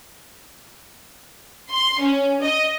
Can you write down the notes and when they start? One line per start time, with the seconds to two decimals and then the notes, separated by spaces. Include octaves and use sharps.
1.69 C6
2.00 C#4
2.40 D#5